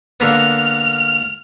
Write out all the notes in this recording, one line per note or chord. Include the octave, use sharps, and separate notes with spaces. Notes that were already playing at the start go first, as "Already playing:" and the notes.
D3 A#3 B3 F6